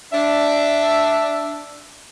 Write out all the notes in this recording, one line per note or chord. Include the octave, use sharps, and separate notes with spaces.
D4 E5